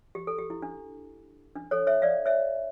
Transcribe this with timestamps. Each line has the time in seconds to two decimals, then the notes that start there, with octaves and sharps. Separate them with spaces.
0.15 G4
0.27 A4
0.38 G4
0.50 E4
0.62 D4
1.56 D4
1.71 A4 C#5
1.87 C#5 E5
2.02 D5 F5
2.26 C#5 E5